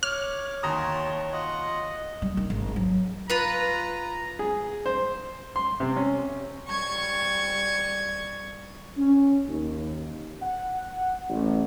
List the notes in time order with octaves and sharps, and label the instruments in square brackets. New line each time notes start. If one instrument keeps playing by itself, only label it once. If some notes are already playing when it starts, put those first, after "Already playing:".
[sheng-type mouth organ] C#5 [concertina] D6 [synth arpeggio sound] F6
[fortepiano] D#2 A#5 D#6 [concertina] F#4 A5 C6
[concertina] F4 F#5 [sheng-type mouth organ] D#5
[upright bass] G3
D#3
G#1
F#3
[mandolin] F4 B4 [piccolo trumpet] A#5
[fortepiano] G#4
C5
C6
C3
C#4
[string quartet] G3 C#6 G#6
[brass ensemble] C#4
D#2
F#5
A1